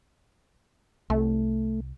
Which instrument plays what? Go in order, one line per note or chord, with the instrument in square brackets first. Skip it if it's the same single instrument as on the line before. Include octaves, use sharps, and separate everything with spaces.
[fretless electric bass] C2 [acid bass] A3